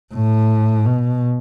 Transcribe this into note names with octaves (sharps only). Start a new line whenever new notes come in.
A2
B2